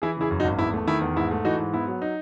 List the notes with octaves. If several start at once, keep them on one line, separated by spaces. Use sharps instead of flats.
E3 E4 G#4
C#3 E4 G#4
F#2
D#4 F#4
G#1
E2 E4
A3
D#3 E4
E2
G#2 E4
A3
E3 D#4 F#4
G#2
B3 E4
F#3
D#4